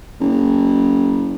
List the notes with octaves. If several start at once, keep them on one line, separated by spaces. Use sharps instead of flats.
F#1